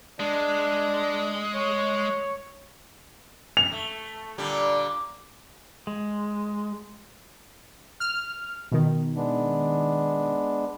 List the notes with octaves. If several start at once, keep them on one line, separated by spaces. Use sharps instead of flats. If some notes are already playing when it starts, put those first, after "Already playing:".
G#3 D4
C#5
F7
A3
A#2 D3 G3
G#3
F6
B2 D#3
G#3 B3 D4